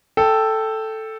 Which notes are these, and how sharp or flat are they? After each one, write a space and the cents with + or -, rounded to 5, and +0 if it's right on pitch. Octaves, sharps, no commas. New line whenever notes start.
A4 +0 G5 +0